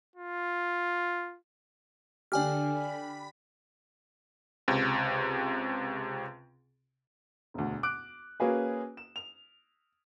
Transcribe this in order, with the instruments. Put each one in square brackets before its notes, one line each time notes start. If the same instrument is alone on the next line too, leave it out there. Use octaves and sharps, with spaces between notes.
[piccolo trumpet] F4
[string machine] D3 [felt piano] D4 G4 [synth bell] D5 G#5 F6
[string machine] B5
[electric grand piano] C#2 C3
[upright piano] E1 D2
D6 F#6 D7
A#3 C#4 F#4 G#4 B4
E7
F7